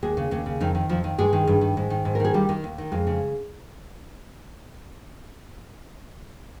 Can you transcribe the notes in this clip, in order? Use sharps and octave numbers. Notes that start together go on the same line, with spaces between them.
D#2 G#3 G#4
C#3
D#2 C#3 C#4
C#3
F2 D#3 D#4
D#3
F2 F3 F4
D#3
G2 G#3 G#4
D#3
G2
D#3
G#2
D#3
G#2
A#4
D#3 G#4
D#2 G3 G4
D#3
D#2
D#3
F2 G#3
C#3